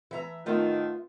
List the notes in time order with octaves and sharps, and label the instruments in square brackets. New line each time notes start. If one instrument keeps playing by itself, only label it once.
[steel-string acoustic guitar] E3 E5 A#5
[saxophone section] A2 D#3 [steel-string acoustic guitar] A3 B3 F4